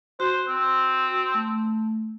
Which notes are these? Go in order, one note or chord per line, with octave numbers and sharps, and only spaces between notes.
F#4 C5
C4
A3